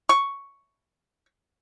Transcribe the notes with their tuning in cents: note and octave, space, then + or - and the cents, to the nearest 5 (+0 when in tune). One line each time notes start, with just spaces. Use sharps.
C#6 +5